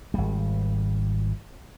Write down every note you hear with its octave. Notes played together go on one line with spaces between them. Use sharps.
G#1 G3